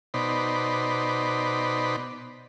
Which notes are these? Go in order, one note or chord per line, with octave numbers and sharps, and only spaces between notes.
B2 D#4 C5 D5 B5